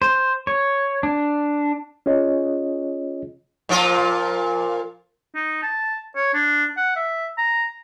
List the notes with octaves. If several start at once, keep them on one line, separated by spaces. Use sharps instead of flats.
C5
C#5
D4
C#4 F4 G#4 C#5 D#5
A#2 F3 F4
D#4
A5
C#5
D4
F#5
E5
A#5